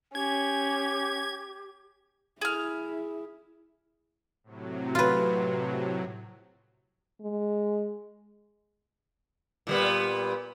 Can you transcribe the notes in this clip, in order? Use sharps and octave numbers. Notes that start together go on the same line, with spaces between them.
C#4 G4 G#6
E4 G#4 F6
A2 C3 F#3
F4 B4
G#3
A#2 G3 B3